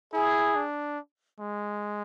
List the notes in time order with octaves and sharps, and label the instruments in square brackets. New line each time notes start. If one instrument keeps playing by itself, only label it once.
[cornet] E4 [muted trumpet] G#4
[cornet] D4
G#3